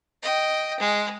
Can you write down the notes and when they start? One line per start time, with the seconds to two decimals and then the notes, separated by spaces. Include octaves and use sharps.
0.23 D#5 G5
0.80 G#3